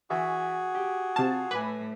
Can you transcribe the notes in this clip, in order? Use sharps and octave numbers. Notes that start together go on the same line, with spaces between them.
E3 F#4 G#4 E5 C#6
G4
C3 F4 A5
A2 A3 B4 G#5 D6